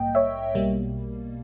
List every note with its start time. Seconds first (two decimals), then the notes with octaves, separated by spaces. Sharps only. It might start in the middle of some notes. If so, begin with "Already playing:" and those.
Already playing: A#1 G#2 G3 A#3 D#5 G5
0.15 C#5 E5
0.55 B1 B2 G3 A#3